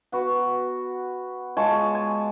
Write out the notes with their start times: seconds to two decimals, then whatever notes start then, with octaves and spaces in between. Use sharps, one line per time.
0.12 B3 F#4
1.57 G#3 F4 C#5 A5
1.95 G#5